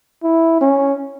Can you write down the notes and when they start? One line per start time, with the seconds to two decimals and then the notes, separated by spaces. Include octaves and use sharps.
0.23 E4
0.61 C#4